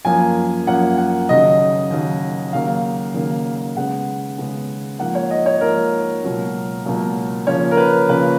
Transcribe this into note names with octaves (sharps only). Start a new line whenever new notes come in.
F#2 F3 A#3 C#4 G#5
F#2 F3 A#3 C#4 F#5
F#5
D#2 C#3 F#3 D#5
D#2 C#3 F#3
D#2 C#3 F#3 A#3 F5
D#2 C#3 F#3 A#3
C#3 G#3 B3 F#5
C#3 G#3 B3
G#2 F3 A#3 F#5
C#5
D#5
C#5
G#2 F3 A#3 A#4
C#2 B2 F#3 A#3
C#2 B2 F#3 A#3
C#3 F3 A#3 C#4 C#5
A#4
B4
C#3 F3 A#3 C#4 B4